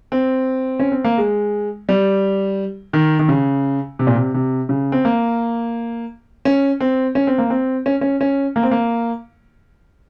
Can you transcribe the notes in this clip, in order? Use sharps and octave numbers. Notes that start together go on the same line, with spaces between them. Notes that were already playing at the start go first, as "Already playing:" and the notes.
C4
C#4
C4
A#3
G#3
G3
D#3
D#3
C#3
C3
A#2
C3
C3
C#3
C4
A#3
C#4
C4
C#4
C4
A#3
C4
C#4
C#4
C#4
A#3
C4
A#3